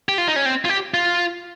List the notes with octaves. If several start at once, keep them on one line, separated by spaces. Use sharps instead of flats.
G4
F4
D#4
C#4
C4
F4
G4
F4